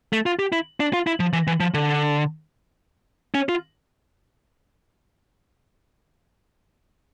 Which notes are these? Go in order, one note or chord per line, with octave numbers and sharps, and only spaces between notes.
A3
F4
G4
E4
D4
F4
E4
F3
E3
E3
F3
D3
C#4
F4